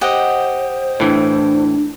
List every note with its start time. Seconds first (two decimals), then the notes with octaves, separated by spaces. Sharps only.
0.01 G4 C5 D#5 F#5
1.00 A2 E3 D4